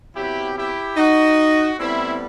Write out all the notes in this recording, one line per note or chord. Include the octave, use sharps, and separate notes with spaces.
C3 F#3 B3 E4 G4
E4 G4
D#4 F#4
A2 G3 B3 C4 E4